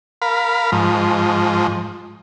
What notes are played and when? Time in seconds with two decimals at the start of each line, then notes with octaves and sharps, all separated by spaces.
0.22 A#4 F5 B5
0.72 G#2 F3